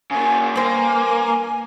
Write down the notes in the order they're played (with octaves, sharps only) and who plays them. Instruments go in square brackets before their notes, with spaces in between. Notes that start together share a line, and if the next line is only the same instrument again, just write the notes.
[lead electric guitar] C#3 A#3 [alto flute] G#5
[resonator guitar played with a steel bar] G2 C5 [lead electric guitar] A#3 [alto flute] G#5